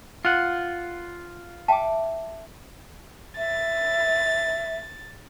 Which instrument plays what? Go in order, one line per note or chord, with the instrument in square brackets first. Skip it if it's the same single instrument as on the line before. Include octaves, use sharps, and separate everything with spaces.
[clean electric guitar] F4 F#5
[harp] E5 D6 [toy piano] G5 A5
[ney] E5 [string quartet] A6